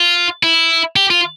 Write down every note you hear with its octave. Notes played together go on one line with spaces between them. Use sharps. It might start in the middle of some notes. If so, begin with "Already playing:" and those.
Already playing: F4
E4
G4
F4